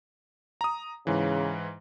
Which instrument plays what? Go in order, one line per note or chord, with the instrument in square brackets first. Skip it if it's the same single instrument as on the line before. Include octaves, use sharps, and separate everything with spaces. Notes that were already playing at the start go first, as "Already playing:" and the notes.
[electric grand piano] A#5 D#6
[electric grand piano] G#2 E3 [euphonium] C#3